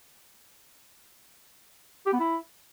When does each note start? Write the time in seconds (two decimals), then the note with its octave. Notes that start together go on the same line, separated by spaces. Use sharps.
2.06 G4
2.13 B3
2.20 E4